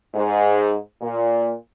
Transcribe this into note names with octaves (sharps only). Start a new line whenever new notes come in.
G#2
A#2